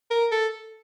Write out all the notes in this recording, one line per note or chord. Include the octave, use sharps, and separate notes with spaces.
A#4
A4